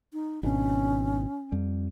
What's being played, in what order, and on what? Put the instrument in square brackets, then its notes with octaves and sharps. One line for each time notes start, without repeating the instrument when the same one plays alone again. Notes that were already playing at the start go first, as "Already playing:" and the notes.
[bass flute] D#4
[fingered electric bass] G#1 B2 D4 [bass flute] C#4
[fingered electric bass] F2 G3